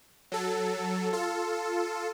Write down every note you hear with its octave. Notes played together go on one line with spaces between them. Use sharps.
F#3 A4
F4 A4